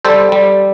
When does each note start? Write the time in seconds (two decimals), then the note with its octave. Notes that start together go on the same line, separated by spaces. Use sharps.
0.05 G3 A4 C5
0.32 G3